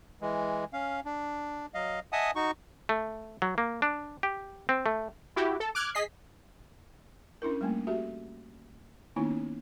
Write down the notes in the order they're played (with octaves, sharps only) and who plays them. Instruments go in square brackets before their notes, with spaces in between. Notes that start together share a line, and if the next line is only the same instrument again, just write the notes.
[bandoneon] E3 G#3
C#4 F5
D4
F#3 D#5 F5
D#5 E5 F#5 G#5 A5 D#6
D#4 F#4 C#6
[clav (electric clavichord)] A3
F#3
A#3
D4
G4
C4
A3
[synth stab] E4 F#4 G4
A4
D6 F6 F#6 G#6
G#4 D#5 B6 C7
[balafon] C#4 D4 E4 A#4
G3 A3 A#3
F#4 G4 A4 E5
D#3 A#3 B3 C#4 D#4 E4